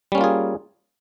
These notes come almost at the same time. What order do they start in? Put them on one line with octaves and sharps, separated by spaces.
G3 C#4 A#3 F4 G#4